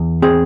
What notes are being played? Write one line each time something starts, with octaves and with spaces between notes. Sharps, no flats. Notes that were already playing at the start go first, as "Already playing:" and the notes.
Already playing: E2
C4 G#4